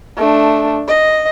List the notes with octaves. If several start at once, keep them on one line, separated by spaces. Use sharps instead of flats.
A3 D4
D#5